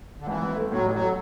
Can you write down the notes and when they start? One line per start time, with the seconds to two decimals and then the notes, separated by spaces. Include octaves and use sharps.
0.20 D3
0.27 G#1 E3
0.42 G#1
0.56 A3
0.71 A2 F#3
0.86 A1
0.94 F#3
1.01 A3